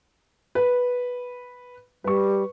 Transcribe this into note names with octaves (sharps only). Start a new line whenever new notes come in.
B4
G3 B4 C#6